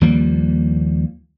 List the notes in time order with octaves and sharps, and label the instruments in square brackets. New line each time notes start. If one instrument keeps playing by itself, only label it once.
[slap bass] D#2 F3 G3 A#3